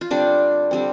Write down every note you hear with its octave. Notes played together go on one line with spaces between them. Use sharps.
F4
D3 G3 C4 D4
D3 G3 C4